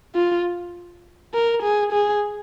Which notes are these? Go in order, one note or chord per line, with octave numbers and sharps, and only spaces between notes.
F4
A#4
G#4
G#4